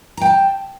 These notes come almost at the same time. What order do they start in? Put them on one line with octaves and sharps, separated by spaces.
A#5 G5 A5